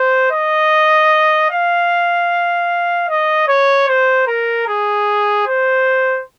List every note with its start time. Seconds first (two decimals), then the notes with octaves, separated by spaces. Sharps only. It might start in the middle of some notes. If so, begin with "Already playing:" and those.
Already playing: C5
0.31 D#5
1.50 F5
3.09 D#5
3.48 C#5
3.88 C5
4.27 A#4
4.68 G#4
5.47 C5